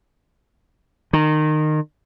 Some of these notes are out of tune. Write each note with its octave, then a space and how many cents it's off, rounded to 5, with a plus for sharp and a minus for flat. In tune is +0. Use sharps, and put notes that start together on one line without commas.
D#3 -20